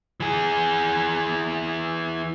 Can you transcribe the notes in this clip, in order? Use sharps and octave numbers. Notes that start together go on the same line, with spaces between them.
E3 G#4